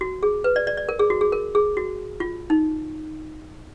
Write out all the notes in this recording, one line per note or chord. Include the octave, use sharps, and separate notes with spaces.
F#4
G#4
B4
D5
D5
D5
A#4
G#4
F#4
G#4
A#4
G#4
F#4
F4
D#4